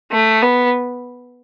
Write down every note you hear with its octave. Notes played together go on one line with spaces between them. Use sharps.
A3
B3